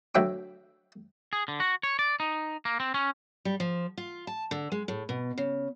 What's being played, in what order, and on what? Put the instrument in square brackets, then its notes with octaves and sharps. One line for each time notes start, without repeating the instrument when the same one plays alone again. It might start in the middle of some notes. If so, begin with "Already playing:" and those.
[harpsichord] D2 F#3 E5 G5 D6
[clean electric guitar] G#4
D3
F#4
C#5
D5
D#4
A#3
C4
C#4
[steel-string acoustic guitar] G3
F3
F4
A5
D3
G#3
A2
B2
C#3